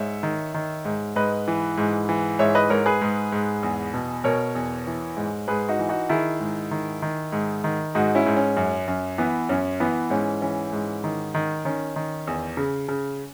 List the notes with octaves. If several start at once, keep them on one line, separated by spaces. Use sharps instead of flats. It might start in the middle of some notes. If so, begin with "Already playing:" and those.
Already playing: G#2 C#5 E5
D#3
D#3
G#2
G#2 B4 D#5
E3
G#2
E3
G#2 C#5 E5
B4 D#5
G#2 A#4 C#5
G#4 B4
G#2
G#2
E2
B2
B2 A#4 C#5
E2
E3
G#2
G#2 G#4 B4
D#4 F#4
E3
D#4 F#4
D#3 E4 G#4
G#2
D#3
D#3
G#2
D#3
G#2 D#4 F#4
C#4 E4
G#2
C#4
F#2
F#2
E3 B3
F#2 C#4
E3 B3
G#2 C#4
E3 C#4
G#2
D#3
D#3
D#3 C#4
D#3
E2
C#3
C#3